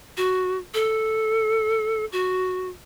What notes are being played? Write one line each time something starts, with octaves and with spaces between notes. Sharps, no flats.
F#4
A4
F#4